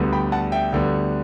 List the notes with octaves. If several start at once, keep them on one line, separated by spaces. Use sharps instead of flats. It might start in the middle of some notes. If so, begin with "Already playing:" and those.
Already playing: D2 D3 G3 B3
G5 B5
F#5 A5
E5 G5
D2 D3 G3 B3